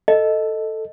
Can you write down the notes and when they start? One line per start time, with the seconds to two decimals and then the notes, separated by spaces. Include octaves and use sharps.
0.08 A4 D#5